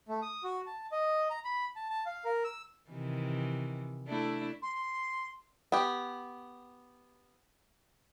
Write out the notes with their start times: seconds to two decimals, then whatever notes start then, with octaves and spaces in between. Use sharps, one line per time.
0.08 A3
0.22 D#6
0.44 F#4
0.66 A5
0.92 D#5
1.30 A#5
1.45 B5
1.76 A5
1.90 A5
2.06 F5
2.25 A#4
2.44 E6
2.90 C3 D#3 E3
4.08 A3 D4 E4
4.62 C6
5.72 B3 G4